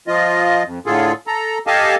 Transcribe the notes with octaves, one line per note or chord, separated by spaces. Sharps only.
F3 F4 D#5
F2
A2 D3 F4 G#4 A4
A4 A#5
G4 A4 D#5 F5 G#5 A5